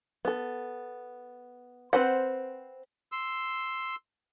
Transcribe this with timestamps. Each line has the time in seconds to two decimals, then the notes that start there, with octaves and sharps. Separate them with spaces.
0.25 B3 A4
1.93 C4 B4 C5 F#5
3.12 C6 E6